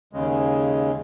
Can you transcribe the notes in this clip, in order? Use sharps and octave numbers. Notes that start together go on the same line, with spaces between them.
D#2 C#3 G#3